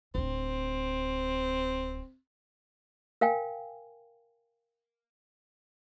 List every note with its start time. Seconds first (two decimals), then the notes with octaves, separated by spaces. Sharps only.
0.15 D1 C4 D4
3.21 A#4 F5 G5 G#5